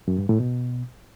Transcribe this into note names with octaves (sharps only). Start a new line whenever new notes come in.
F#2
G2
A2
B2